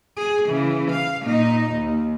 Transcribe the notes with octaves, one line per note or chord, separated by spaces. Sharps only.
G#4
C#3 E3
F5
A#2 D#4
D#2